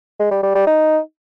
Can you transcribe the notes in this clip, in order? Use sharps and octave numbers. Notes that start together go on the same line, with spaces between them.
G#3
G3
G3
G3
D#4